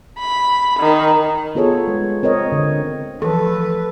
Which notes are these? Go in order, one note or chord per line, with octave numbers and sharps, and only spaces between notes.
B5
D#3
B3 F4 G#4 A4 C#5
G#3
C4 A#4 C#5 D#5
D3
E3 F3 A4 B4